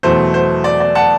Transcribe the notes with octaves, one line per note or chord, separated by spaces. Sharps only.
E2 B2 F#3 A3 C5
C5
D5
D5
F#5 A5